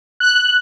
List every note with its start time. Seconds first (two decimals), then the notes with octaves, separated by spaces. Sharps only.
0.20 F#6